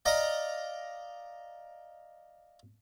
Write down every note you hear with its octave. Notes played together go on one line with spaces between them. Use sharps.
D5 D#5 F5 A#5 D6